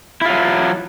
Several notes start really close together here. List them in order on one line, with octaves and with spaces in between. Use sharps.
E4 F4 F#3